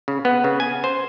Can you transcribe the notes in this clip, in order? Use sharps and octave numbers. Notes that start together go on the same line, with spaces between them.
C#3
B3
C#3
G#5
C5